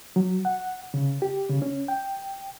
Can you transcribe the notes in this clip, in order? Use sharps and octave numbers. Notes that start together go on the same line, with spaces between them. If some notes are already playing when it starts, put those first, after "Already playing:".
F#3
F#5
C#3
G4
C#3
C#4
G5